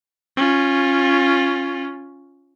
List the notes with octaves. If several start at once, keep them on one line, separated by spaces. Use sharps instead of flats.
C#4 F4